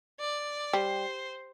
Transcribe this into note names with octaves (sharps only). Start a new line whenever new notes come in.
D5
G3 C5